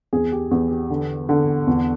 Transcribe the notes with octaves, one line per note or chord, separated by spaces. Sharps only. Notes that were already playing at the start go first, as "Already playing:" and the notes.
E2 G#4
G4
E2 G#4
G4
D3
D3
E2